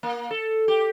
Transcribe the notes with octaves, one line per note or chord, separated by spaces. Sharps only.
A#3
A4
G4